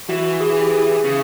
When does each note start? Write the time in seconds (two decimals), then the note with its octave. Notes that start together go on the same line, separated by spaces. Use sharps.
0.09 E3 F#4
0.40 G#4
0.60 G4
0.72 G#4
1.05 C#3